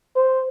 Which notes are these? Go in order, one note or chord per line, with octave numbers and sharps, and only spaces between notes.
C5